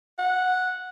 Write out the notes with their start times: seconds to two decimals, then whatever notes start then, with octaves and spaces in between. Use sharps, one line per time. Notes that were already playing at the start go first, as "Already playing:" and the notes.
0.18 F#5